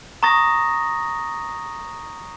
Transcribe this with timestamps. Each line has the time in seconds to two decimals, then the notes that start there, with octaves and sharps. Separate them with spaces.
0.23 A#5 C#6 D#6 A6 A#6